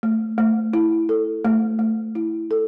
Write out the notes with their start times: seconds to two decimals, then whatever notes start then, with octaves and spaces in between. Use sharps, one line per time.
0.03 A3
0.38 A3
0.73 E4
1.09 A4
1.45 A3
1.79 A3
2.15 E4
2.51 A4